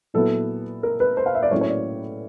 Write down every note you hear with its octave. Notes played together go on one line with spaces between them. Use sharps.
A#2 F#3 B3 E4 A4
A#4
B4
C5
F5
E5
D5
A2 F#3 A#3 C#4 E4 C#5
C#5
D5